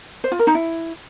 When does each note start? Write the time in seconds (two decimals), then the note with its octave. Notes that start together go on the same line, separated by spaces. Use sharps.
0.24 C5
0.32 F4
0.39 A#4
0.47 D#4
0.55 E4